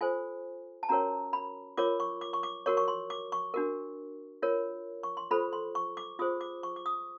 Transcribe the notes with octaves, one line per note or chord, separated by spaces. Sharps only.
F4 A4 C5 G#5
A5
C#4 F#4 A#4 C#5 A#5
B5
F4 A#4 C#5 D6
C#6
D6
C#6
D6
F#4 A#4 C#5 C#6
C#6
C6
D6
C#6
D4 F#4 A#4
F4 A#4 C#5
C#6
C6
F4 A4 C5 B5
C6
C#6
D6
F4 G#4 C5 D#6
D6
C#6
D6
D#6